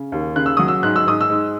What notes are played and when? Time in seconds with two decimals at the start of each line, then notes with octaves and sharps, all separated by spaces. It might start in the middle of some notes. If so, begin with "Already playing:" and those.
Already playing: C#3
0.12 D#2
0.36 C#3 F#6
0.46 E6
0.57 F#3 D#6
0.68 E6
0.83 G#2 F#6
0.96 E6
1.07 G#2 D#6
1.21 E6
1.30 G#2